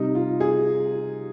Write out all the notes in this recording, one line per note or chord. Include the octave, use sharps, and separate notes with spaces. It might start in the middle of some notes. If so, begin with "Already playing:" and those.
Already playing: C3 G3 D#4
F4
G#4